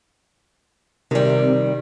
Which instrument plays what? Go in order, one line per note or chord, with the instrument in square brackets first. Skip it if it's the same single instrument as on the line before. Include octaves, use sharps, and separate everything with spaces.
[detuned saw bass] C3 [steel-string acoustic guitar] D#3 G3